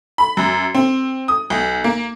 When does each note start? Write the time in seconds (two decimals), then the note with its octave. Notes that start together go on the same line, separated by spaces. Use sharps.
0.18 B5
0.37 F#2
0.75 C4
1.28 D#6
1.50 B1
1.84 A#3